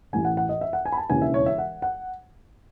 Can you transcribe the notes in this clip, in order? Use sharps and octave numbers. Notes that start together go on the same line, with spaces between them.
A1 A2 E3 G#5
F#5
F#5
D#5
E5
F#5
G#5
B5
A5
E1 D#2 C#3 E3 G#5
E5
C#5
E5
F#5
F#5